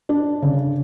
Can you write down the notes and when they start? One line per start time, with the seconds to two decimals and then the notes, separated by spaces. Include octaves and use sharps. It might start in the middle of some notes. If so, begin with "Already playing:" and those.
0.09 D4
0.42 C#3